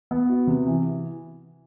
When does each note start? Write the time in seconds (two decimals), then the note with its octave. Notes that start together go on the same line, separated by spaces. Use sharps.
0.11 B3
0.29 F#4
0.47 C3
0.66 E3